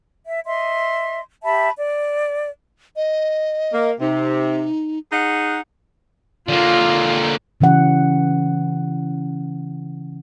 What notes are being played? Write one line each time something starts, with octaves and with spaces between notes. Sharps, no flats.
E5
D#5 E5 C6
G4 E5 A5 B5
D5
D#5
A#3
C3 D#4
D#4 G#4 F#5
D3 A#3 F4
C#3 E3 C#4 F#5